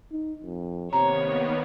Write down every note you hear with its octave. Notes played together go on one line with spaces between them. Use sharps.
D#4
F2
C3 D#3 A#3 B3 C#5 A#5